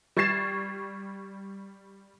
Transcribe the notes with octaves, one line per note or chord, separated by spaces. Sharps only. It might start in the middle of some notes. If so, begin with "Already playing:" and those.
G3 C#6 G#6 A6 C7 E7